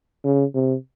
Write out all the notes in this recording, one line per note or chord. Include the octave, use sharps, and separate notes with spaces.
C#3
C3